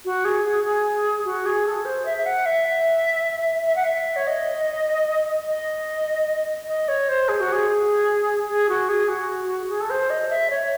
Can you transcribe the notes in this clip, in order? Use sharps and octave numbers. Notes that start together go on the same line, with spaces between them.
F#4
G#4
G#4
G#4
F#4
G#4
A4
C5
E5
E5
F#5
E5
E5
F#5
E5
C#5
D#5
D#5
D#5
C#5
C5
G#4
F#4
G#4
G#4
F#4
G#4
F#4
G#4
A4
C5
D#5
E5
C#5